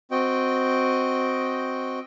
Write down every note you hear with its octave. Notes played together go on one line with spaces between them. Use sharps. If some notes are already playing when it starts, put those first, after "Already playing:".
C4 F#4 D#5 G5